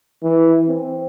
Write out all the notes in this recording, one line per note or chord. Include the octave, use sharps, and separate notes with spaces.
E3
C4